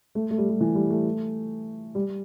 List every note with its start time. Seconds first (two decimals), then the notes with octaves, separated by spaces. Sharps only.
0.15 A3
0.31 A3
0.38 G3
0.50 G3
0.60 E3
0.75 G3
0.90 A3
1.95 G3